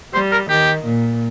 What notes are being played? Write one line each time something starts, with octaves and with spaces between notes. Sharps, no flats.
G3 C5
A#4
D#3 G4
A#2